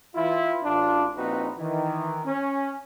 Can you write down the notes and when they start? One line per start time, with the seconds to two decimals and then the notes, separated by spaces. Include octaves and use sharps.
0.15 E3 E4 F4
0.63 A1 D4 F4
1.17 A#1 A#2 C4 D#4 F#4 B4
1.58 D#3 E3
2.25 C#4